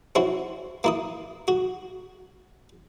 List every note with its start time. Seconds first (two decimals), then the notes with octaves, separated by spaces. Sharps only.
0.15 C4 C#4 E4 F#4
0.84 A#3 E4 D#6
1.48 F#4